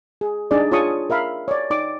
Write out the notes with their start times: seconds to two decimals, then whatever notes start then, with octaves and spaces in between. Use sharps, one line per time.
0.21 G#4
0.51 D4 D#4 G#4 D5
0.72 F4 G#4 C#5 A5 C#6 D#6
1.10 A#4 E5 F5 B5
1.48 C#5 D5
1.70 D#4 D5 D6